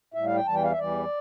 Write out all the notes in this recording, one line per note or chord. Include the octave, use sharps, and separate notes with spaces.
A2 G3 E5
F5
G5
E2 E3 G3 A5
G5
F5
E5
E2 E3 G3 D5